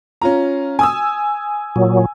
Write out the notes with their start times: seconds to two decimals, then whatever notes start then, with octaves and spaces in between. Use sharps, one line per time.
0.22 C#4 F4 A#5
0.79 G#5 D#6 E6
1.76 A#2 F#3